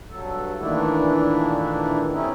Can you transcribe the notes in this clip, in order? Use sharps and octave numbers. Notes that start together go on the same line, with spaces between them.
G2 F#3 A4
A#2 D#3 E3 A3 D4 E4
C3 A3 C#4 D#4 E4